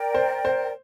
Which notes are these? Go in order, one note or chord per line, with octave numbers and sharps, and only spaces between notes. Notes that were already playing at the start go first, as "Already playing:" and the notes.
Already playing: A#4 D5 G5
C5
C5